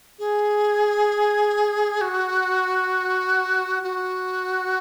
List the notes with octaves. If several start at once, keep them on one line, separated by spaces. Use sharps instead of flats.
G#4
F#4
F#4